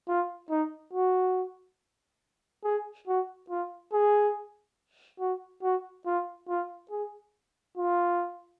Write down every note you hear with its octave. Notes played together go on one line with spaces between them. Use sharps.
F4
D#4
F#4
G#4
F#4
F4
G#4
F#4
F#4
F4
F4
G#4
F4